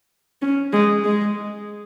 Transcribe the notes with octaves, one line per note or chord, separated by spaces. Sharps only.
C#4
G#3
G#3